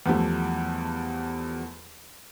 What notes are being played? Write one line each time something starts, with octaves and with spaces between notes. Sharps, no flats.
E2 F3 G3 A3